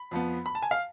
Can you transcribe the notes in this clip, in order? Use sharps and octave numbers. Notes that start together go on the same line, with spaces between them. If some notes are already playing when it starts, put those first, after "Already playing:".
Already playing: B5
F2 F3 B3
B5
A5
G#5
F5